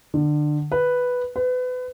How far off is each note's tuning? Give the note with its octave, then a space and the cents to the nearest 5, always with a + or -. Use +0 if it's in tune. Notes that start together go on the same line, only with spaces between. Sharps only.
D3 +25
B4 +0
B4 +30